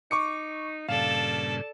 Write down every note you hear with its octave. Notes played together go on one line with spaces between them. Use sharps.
D#4 C#6 D6 C#7
G2 A#2 C#3 A4 D5 F5 A5